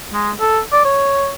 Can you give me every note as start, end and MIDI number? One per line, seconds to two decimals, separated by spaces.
0.13 0.31 56
0.40 0.60 69
0.72 0.84 74
0.85 1.32 73